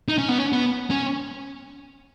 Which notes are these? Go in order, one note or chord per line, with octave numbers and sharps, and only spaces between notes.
D#4
C#4
B3
C#4
B3
C#4